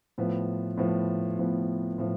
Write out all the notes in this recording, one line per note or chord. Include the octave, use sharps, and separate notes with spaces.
A2 F3 B3
A2 F3 B3
A2 F3 B3
A2 F3